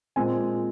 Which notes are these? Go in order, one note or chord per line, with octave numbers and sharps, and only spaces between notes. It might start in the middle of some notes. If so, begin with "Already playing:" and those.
A#2 G#3 C4 G#5